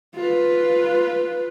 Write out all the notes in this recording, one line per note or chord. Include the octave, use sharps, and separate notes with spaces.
F4 B4